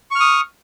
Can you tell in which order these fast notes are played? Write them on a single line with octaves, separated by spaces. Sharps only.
C#6 F6 D#6